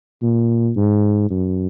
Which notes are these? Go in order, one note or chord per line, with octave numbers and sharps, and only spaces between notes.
A#2
G#2
F#2